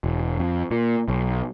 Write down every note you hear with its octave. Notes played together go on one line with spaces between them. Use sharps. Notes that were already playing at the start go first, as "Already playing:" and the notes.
E1
F2
A#2
B1